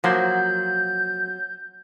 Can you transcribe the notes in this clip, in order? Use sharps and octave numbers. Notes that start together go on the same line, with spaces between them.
F3 F#3 A#3 C5 G6